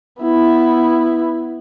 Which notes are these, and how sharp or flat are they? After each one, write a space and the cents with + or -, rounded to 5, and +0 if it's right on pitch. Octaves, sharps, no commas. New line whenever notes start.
B3 +0 E4 +0